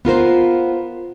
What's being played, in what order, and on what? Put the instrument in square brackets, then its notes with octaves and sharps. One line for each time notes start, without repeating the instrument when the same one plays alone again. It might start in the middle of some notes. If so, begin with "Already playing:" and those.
[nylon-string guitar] B3 F4 A#4 C5